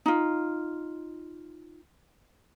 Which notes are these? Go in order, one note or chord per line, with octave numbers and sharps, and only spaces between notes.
D#4 F4